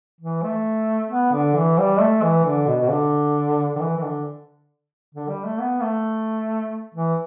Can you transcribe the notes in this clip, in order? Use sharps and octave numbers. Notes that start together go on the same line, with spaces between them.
E3
A3
B3
D3
E3
G3
A3
E3
D3
B2
B2
D3
D3
E3
E3
D3
D3
G3
A3
B3
A3
E3